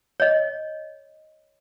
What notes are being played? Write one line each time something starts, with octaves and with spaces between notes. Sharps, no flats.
C#5 D#5